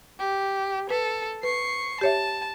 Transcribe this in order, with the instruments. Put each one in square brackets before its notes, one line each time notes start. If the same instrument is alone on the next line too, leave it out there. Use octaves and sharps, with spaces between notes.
[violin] G4
[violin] A4 [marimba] B4
[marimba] B4 [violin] C#6 C7
[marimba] G4 C#5 E5 [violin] A5